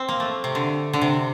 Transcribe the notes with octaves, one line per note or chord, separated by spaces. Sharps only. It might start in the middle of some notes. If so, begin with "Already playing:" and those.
Already playing: C4
A#3
A3
C3
D3
D3
C3